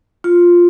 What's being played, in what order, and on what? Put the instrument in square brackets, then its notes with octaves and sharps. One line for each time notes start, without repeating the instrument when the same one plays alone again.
[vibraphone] F4